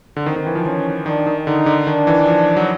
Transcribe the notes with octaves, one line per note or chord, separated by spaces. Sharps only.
D3
D#3 C4
D#3
E3
F3
F3 C#4
D#3 D4
D#3
D3 D#4
D3
D#3 D4
E3
F3
F#3